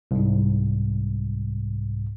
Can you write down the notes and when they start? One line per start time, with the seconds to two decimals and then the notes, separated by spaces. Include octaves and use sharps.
0.11 C2 G#2